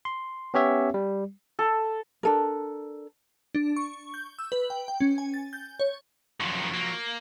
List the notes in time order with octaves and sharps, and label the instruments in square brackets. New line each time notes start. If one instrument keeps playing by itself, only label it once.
[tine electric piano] C6
B3 C#4 G4 C#5 E5
G3
[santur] A4
[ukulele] D4 A4 A#4
[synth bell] D4
C#6
G6
E6
B4
G5
G5
C#4
G#5
A6
G6
C#5
[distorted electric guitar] F#2 D#3 [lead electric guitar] F3 F#3
[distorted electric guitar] A#3